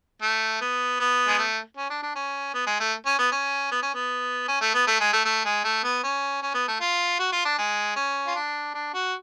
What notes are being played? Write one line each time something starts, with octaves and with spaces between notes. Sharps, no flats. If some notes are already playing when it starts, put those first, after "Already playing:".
A3
B3
B3
G#3
A3
C#4
D4
D4
C#4
B3
G#3
A3
C#4
B3
C#4
B3
C#4
B3
C#4
A3
B3
A3
G#3
A3
A3
G#3
A3
B3
C#4
C#4
B3
A3
F4
F#4
F4
D4
G#3
C#4
F4
D4
D4
F#4